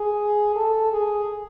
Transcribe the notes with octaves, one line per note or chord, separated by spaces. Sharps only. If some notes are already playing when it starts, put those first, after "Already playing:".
Already playing: G#4
A4
G#4